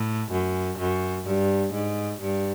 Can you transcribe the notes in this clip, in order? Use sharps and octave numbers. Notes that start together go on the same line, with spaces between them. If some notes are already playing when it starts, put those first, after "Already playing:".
Already playing: A2
F#2
F#2
G2
G#2
G2